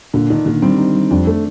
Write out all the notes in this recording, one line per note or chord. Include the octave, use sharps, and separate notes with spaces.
A#2 D3
D#3 D4
A#2 D#3
G3 C4
D#4
G3
F2 D4
A3